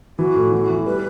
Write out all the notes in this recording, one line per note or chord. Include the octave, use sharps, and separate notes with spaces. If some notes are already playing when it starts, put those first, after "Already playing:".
E3 F#4
A2
E3
E3
G3 B4